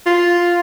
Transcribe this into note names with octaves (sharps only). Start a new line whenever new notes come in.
F4